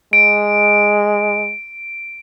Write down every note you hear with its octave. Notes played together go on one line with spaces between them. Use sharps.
G#3 D7